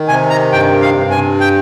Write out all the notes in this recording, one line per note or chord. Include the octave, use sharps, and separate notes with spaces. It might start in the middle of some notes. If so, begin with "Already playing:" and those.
Already playing: D#3
C3 G#5
A#5
G2 G5
F5
G2
G#5
G5